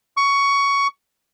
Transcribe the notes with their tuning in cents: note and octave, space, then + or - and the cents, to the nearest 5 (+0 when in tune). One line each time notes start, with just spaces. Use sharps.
C#6 +15